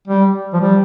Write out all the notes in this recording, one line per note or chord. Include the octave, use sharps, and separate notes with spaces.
G3
F3
G3